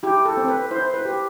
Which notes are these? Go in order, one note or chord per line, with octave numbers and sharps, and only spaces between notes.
E4 G4
A4
C4
B4
E4 C5
B4
G4